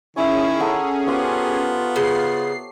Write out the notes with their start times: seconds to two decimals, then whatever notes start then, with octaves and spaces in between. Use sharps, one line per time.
0.16 D#3 C#4 E4 G#4 C#5 E5
0.60 A4 F#5 A#5
1.07 B3 F4 G4 C5 C#5
1.96 C#3 C7